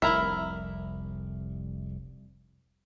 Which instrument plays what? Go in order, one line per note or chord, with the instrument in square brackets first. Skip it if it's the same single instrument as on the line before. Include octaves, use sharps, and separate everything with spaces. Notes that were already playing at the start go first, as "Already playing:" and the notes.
[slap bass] F1 C2 [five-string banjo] E4 A#4 E5